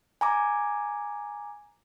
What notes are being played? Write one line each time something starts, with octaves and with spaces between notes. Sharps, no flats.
G#5 A#5 D6